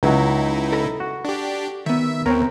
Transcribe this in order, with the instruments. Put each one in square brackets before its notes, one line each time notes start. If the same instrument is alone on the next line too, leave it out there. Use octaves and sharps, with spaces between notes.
[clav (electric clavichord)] C#2 F#3 [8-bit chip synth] D#4 E4
[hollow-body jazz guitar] A4 A#5 B5
[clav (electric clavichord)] F#4
[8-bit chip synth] D4 G4
[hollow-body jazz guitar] D#3 B3 [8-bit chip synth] E5
[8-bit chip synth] D#2 [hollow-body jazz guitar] B3 C4 G5 [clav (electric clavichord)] A#4 C#5